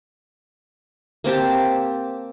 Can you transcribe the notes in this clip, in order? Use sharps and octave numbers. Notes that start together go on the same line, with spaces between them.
A#3 C4 G4 A5